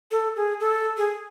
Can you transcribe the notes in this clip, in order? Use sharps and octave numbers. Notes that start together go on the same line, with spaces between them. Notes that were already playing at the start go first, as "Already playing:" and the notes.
A4
G#4
A4
G#4